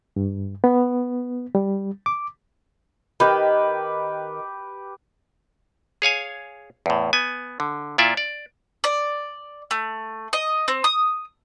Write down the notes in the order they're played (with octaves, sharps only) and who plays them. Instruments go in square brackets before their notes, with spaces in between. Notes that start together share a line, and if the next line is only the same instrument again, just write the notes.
[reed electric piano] G2
B3
G3
D6
[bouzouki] D#3 [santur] G4 B4
[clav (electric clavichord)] G#4 C#5 F5 G#5
E2 A2
B3 G#5
D3
A#2 E4 F4 D5 E5
D5
[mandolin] D5
A3
D#5
C4
D#6